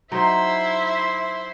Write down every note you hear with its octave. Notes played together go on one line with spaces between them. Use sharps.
F#3 D#4 E4 C5 E5 C6